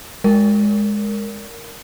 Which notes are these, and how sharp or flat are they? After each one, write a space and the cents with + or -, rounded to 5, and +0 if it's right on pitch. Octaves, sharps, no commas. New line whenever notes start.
G#3 +0 A#4 -10